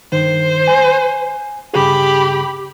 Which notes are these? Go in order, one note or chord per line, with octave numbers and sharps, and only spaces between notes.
G2 D#3 C5
G#5
G2 C#3 G4 G#4 B5